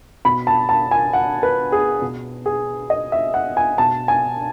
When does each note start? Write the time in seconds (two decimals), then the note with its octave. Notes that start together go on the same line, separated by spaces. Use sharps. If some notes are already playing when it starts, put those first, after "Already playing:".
0.25 B2 B5
0.47 A5
0.69 A5
0.91 G#5
1.13 F#5
1.43 B4
1.72 G#4
2.02 B2
2.46 G#4
2.90 D#5
3.12 E5
3.34 F#5
3.57 G#5
3.78 B2 A5
4.08 G#5